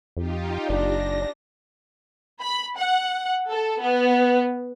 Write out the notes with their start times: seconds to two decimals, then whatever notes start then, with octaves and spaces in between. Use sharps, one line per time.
0.17 F2 D#4 F4 G4
0.69 F#1 D4 A#6
2.41 B5
2.77 F#5
3.51 A4
3.82 B3